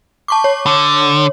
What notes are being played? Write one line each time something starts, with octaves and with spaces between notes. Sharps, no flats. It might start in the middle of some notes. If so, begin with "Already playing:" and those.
A5 C#6 D6
C#5
D3